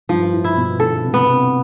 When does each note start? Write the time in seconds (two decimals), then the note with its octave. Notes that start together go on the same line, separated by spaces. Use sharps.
0.09 G2 F3
0.32 A2
0.44 E4
0.57 B2
0.79 D3 A4
0.94 D3
1.03 C3
1.14 B3
1.26 C3